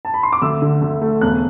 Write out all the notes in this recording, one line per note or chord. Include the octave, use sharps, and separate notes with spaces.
A5
B5
C6
D6
D2 E6
D3
D2
A3
E1 F#6